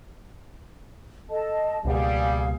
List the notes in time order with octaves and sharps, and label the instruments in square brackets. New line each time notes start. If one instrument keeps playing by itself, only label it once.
[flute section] A4 D#5 A5
[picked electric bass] C#2 B2 A#3 [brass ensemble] G3 [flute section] G#4 F5